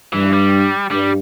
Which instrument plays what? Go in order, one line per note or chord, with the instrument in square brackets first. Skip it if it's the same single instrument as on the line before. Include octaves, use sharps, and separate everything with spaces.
[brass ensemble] G2 [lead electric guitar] E3
[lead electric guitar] G3
[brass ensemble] G2 [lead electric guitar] G3